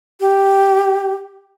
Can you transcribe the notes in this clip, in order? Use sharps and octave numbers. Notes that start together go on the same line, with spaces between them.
G4